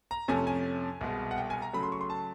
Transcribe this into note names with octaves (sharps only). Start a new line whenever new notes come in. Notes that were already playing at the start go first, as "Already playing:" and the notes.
A#5
F2 C3 F3 A3 C#4 G#5
G#5
C2 B2 G#3
F#5
G5
G#5
A#5
C#3 F#3 A3 B5
C6
C#6
C6
A5